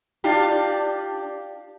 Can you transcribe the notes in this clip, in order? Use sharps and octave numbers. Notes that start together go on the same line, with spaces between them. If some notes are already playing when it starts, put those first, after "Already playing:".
D4 F4 G4